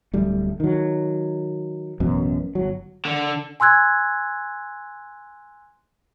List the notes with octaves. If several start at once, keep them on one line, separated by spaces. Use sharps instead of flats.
D1 G3 A3
D#3 F#3
A1 F#2 B2
G1 F#3
D3
G#5 C6 E6 F#6 G#6